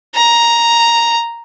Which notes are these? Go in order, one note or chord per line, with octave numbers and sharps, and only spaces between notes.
A#5